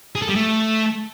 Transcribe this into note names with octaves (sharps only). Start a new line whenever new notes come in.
G#4
A4
G3
A3